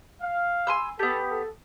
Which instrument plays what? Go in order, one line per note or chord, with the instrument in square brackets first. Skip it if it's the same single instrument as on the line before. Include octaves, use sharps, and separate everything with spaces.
[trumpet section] F5
[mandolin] G#5 C6 E6
[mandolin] B3 G4 [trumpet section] A4
[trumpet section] A4